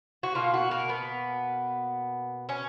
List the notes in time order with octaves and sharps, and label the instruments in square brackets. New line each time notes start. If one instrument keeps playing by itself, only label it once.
[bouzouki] F#4
B2 A#3 F4
F#4
A#4
B3
C#4